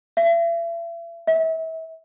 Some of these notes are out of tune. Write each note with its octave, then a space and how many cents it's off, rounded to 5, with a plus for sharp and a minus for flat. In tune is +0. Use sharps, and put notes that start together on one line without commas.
E5 +40
E5 -35